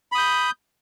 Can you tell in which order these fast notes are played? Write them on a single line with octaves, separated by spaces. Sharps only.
B5 D#6 G6